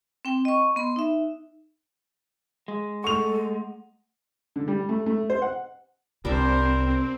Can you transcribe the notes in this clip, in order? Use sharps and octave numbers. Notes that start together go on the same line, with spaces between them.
C4 G5
D#5 C#6
B3 C6
D#4 E5
G#3
A3 A4 F#5 C#6 F7
D3
G3
A3
A3
C5
F#5
C2 G3 C4 D4 A#4 C5 E5